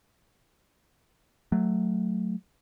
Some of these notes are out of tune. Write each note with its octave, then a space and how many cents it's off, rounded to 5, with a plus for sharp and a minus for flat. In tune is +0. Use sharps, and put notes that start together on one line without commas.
F#3 +0 A3 +0